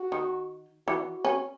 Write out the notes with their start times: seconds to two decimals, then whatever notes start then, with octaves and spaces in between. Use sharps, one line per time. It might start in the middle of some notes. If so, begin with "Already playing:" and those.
Already playing: F#4
0.12 D#3
0.87 E3 F#4
1.16 F#4
1.25 C#4